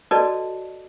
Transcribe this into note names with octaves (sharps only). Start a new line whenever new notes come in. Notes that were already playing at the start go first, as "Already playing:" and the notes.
F#4 A4 B4 D5 D#5 A5